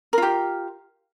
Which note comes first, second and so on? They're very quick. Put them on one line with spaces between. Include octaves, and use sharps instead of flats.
A#4 F4 G4